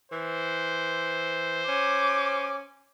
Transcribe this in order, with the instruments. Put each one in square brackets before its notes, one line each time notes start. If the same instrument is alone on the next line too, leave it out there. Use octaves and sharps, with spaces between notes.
[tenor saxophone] E3 [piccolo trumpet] C5
[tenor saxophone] C#4 [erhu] D6